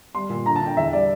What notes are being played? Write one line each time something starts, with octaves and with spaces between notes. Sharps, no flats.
G3 C6
A#2
D3 A#5
A5
D3
G5
E2 E5
G3 D5